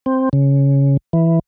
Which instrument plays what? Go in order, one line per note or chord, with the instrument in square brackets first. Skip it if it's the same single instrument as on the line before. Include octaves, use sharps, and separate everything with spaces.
[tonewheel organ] C4
C#3
E3